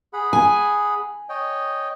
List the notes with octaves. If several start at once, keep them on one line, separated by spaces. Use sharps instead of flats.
G#4 F#5 B5
G#5
C#5 D#5 G5